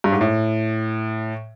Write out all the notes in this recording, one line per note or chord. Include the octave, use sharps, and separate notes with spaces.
G2
G#2
A2